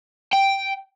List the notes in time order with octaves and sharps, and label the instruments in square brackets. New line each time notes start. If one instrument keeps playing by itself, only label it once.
[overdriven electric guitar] G5